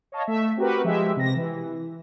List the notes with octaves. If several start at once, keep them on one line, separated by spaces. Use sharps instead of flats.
C#5 D#5 F5 A5
A3 E5
C4 F#4 G4 A#4 B4
F3 G#3 G4 E5
C3 A#6
E3